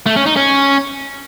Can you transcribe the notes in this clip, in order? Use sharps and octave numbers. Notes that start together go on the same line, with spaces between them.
A3
C#4
D#4
C#4